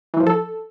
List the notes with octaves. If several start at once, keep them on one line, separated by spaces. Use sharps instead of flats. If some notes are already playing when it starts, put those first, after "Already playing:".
E3
F3
A4